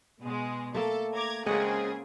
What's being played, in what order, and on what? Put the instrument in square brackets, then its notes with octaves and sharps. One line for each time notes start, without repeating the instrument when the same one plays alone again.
[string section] B2 G#3
[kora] A3 A#3 [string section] A4
[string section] A#5 D6 G#6
[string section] C#3 C4 G#4 [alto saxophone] G#3 [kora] A#4 F#5